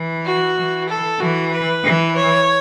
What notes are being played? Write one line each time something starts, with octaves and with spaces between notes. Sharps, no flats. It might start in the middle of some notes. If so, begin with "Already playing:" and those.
Already playing: E3
F#4
E3
A4
E3 F#4
B4
E3
C#5